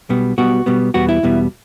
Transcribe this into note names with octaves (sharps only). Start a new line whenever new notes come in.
B1 B2 G3 B3
B1 B2 G3 B3 F#4
B1 B2 G3 B3
E2 B2 G3 B3 F#4
E4
E2 B2 G3 B3